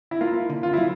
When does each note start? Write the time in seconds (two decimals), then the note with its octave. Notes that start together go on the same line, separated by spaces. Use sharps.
0.11 E4
0.21 A#3 F4
0.50 D3
0.63 F4
0.73 F#3 E4